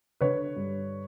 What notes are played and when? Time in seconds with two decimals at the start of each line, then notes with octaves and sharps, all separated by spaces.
0.21 D3 B4 C#5
0.56 G2